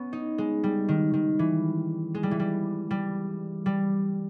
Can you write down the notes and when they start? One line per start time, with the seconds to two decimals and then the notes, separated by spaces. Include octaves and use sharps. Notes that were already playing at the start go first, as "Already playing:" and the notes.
Already playing: B3 C#4
0.13 D#4
0.38 G#3
0.64 G3
0.89 D#3
1.14 D#3
1.39 E3
2.15 G#3
2.23 G3
2.31 E3
2.40 G3
2.91 G3
3.66 G3